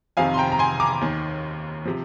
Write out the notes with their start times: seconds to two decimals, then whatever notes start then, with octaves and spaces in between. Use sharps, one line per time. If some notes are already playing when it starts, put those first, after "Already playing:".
0.17 F2 C3 D#3 F5 G#5
0.34 C6
0.38 G5 A#5
0.52 A#5
0.59 G#5 C6
0.80 A#5 D6
1.01 D#2 D#3
1.85 C3 F3